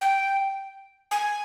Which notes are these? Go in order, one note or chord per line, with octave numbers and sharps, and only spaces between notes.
G5
G#5